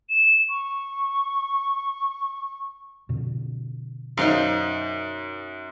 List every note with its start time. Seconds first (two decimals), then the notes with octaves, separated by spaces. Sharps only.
0.10 E7
0.49 C#6
3.09 F2 B2 D3
4.17 F#2 D#4 C5 F5